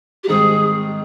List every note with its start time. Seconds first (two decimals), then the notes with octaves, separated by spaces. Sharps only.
0.23 G4
0.27 G#2 D#3 G3 C4 G#4